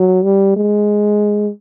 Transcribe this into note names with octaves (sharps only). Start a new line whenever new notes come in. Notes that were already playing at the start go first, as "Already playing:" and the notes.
Already playing: F#3
G3
G#3